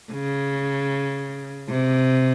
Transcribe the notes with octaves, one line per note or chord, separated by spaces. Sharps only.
C#3
C3